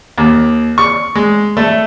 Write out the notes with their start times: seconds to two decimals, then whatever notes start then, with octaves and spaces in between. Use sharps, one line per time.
0.18 D#2
0.78 C#6
1.15 G#3
1.57 A3